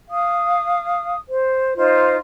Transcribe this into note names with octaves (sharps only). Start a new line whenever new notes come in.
F5 D#6
C5
D#4 F4 C5